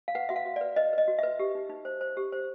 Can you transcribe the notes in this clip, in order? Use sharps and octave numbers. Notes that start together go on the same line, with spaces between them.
F5
B4 F#5
F#4 E5
F5
F#4
D5
B4
B4 D#5
B4 D#5
F#4
B4 E5
G4
D#4
D#4
C5
C5
G4
C5